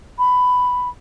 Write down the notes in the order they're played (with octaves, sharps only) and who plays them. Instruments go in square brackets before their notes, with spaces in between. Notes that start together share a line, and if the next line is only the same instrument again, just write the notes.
[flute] B5